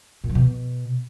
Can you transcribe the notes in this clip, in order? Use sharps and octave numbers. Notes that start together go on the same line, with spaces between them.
A#2
F#3
B2